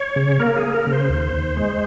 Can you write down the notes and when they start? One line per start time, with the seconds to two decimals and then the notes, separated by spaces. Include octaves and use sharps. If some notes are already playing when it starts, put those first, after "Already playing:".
Already playing: C#5
0.16 C#3
0.39 A#3 A#4
0.56 G#4
0.63 A#3
0.74 A#4
0.87 C#3
0.92 C5
1.09 D#2
1.33 D#2
1.57 G#3